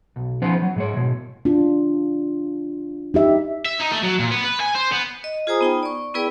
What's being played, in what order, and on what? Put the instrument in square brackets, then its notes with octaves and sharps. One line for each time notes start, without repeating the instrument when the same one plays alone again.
[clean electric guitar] B1
F3 B3 C#4 D#4 C5
F#3
G#2 G#3 C#5
B2 G#3
[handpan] D4 F4
D#4 G4 E5
[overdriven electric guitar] E5
D#4
A3
F#3
A#2
B3
B4
G#5
C5
B3
[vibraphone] D#5
F4 G#4 C5 G#5 A#5 D#6
B3 D#4 G5
D5 C#6
B3 E4 G#4 B4 D5 G5